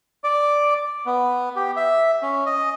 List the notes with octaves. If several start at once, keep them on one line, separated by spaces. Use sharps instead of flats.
D5
B3
G4
E5
C#4
D#5